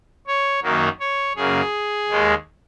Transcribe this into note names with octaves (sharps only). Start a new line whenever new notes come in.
C#5
F#2 D#3 F#3 A#3
C#5
F#2 C#3 A#3 G#4
D#2 D#3 G#3